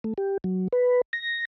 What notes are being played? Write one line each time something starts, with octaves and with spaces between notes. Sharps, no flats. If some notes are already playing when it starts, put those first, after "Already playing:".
A3
G4
F#3
B4
A#6